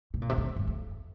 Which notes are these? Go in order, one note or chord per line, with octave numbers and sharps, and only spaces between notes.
C3
A#2
C3
D3
G2
F2